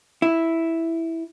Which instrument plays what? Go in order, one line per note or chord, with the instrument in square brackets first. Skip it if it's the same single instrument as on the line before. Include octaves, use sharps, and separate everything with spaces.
[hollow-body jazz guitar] E4